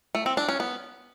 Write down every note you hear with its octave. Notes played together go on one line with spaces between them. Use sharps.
A3
C4
D4
C#4
B3